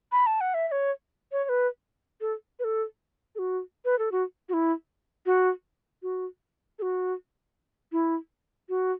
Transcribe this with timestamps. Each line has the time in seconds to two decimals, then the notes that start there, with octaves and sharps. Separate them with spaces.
0.12 B5
0.26 A5
0.41 F#5
0.54 E5
0.68 E5
0.72 C#5
1.32 C#5
1.44 C#5
1.49 B4
2.21 A4
2.59 B4
2.64 A4
3.35 A4
3.39 F#4
3.85 B4
3.99 A4
4.12 F#4
4.49 F#4
4.53 E4
5.26 F#4
6.03 F#4
6.79 A4
6.82 F#4
7.92 E4
8.69 F#4